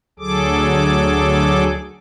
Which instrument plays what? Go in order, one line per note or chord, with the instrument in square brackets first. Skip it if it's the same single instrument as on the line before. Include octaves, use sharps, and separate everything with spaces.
[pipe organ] D2 F#3 G#4 A4 D6